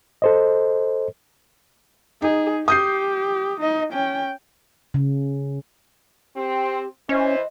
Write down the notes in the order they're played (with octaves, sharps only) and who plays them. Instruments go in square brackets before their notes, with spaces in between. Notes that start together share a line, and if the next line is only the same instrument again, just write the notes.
[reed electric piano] A4 C5 D#5
[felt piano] D#4 [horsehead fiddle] G#4
[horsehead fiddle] G4 [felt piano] D#6 G6 C7
[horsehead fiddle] D#4 D#5
C#4 G5
[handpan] C#3
[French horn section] C4 [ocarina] G4
[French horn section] E3 C5 [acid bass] C#4 [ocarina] D#5